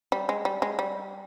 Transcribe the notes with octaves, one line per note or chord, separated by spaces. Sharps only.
G3
G#3
G3
G#3
G3